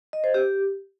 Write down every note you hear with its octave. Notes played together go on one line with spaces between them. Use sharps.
D#5
C5
G4